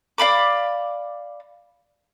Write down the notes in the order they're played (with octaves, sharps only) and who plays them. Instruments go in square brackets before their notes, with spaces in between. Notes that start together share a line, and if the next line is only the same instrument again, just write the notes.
[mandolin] D5 F5 B5 D6